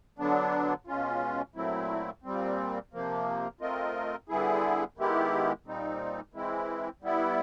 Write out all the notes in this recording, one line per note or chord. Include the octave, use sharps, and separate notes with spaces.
D3 F#3 B3 D4
B2 G#3 C#4 F4
A#2 F#3 A3 C4 E4
A#2 G3 C4
C3 F3 A#3
A3 C4 F4 A#4 D#5
D3 G3 B3 E4 G#4
D#3 G#3 B3 E4 G4
A#2 G3 C4 D#4
E3 G#3 C4 E4
G3 B3 E4